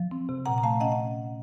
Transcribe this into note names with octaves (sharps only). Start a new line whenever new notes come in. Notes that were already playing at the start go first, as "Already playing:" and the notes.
Already playing: F3
C4
C3
A#2 F#5 A#5
A#5
A3 F5 A5
C#4 D#5 F#5
F#5